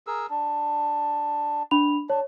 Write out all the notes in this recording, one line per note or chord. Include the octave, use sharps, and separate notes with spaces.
G#4 A#4 E6
D4
D4 B5 F7
D4 C#5